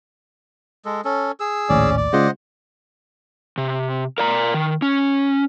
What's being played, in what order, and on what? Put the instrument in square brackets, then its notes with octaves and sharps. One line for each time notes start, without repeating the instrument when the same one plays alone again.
[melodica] G#3 A4
C#4 A4
G#4 E6
[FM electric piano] A#1 D#2 A2 [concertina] C#4 D5
[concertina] D5
[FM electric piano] C#3 G#3 F4 [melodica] C5 D#5 F#5
[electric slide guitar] C3
A#4 D5 A#5
D#3
C#4